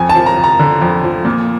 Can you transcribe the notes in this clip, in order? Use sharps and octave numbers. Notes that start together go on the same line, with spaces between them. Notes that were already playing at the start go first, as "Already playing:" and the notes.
Already playing: F2 G#5
A5
F3
A#5
F2
A#5
D3
F2
F3
A#2